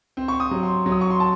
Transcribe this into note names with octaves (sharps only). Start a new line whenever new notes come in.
C4
C#6
D#6
F#3
C6
F#3
D#6
C#6
C6
A5